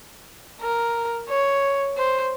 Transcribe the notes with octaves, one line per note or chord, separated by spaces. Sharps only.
A#4
C#5
C5